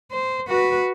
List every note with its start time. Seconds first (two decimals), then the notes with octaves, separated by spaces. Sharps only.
0.11 C5
0.48 F#4 B4